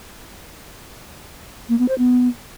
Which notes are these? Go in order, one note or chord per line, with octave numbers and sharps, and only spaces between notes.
A#3
B3
C5
B3